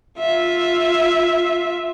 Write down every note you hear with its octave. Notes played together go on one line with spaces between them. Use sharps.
F4 E5